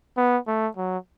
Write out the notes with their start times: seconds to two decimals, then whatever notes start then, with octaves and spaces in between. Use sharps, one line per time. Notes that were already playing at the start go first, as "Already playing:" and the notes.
0.17 B3
0.47 A3
0.77 F#3